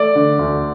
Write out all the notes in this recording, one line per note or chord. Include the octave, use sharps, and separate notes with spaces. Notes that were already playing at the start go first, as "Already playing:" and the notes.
Already playing: A3 D5
D3
D2